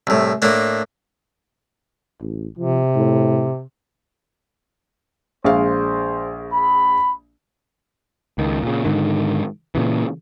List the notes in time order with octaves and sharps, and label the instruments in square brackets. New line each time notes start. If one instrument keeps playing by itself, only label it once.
[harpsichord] C2 A2
A2 A#3 D4
[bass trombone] A1
[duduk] C3 [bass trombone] F3
[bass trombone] A2
[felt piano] A#1 G#3 F5 [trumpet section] C5
[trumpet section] B5
[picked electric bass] C#2 D#3
A#2 C#3
G#2 D3 D#3
A#2 C#3 E3